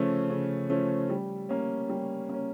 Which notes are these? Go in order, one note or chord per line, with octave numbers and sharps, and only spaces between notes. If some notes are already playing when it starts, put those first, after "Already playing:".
Already playing: C#3 F3 A3 C#4
C#3
F3 A3 C#4
G3
A#3 C#4
G3
A#3 C#4